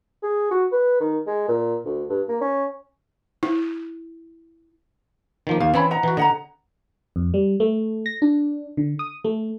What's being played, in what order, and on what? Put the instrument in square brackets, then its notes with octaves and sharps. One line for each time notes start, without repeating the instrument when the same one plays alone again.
[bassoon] G#4
F#4
B4
D#3
G#3
A#2
D2
G2
A#3
C#4
[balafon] E4
[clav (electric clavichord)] D#3 F3 A#3
[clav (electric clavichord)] D#2 [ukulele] F5
[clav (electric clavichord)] E3 C4 [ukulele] C#4 C#5 B5
[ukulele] D#5 F#5 A#5
[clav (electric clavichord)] E3 F#4
[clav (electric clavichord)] D3 [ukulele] D#5 F#5 A#5
[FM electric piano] F2
G3
A3
A#6
D4
D3
D#6
A3